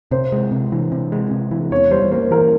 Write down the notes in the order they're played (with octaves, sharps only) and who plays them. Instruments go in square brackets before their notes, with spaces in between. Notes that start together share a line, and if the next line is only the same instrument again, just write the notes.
[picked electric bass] C3 [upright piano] C5
[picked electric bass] G#3
C3
E3
C3
G#3
C3
E3
[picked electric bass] E2 [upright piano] C#5
[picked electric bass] G3 [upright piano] C5
[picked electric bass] A#3 [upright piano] C5
[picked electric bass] E3 [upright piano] A#4